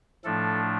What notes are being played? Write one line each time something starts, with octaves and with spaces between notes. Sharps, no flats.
A2 F3 A3 D4 A4